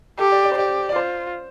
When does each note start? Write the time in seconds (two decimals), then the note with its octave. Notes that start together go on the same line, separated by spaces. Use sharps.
0.19 G4 A4
0.32 D5
0.45 D5
0.52 C5
0.57 G4 D5
0.89 D5
0.95 F4 C5